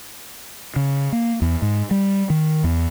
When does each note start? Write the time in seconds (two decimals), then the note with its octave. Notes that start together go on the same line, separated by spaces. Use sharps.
0.76 C#3
1.12 A#3
1.42 E2
1.62 G#2
1.91 G3
2.30 D#3
2.64 E2